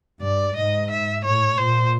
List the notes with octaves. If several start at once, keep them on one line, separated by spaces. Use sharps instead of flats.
G2 D5
G#2 D#5
E5
A2 C#5
A#2 C5